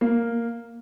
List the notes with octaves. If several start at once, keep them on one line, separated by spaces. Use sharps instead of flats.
A#3